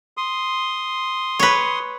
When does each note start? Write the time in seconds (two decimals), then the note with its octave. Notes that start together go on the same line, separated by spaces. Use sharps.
0.17 C6 D#6
1.39 B4 C#5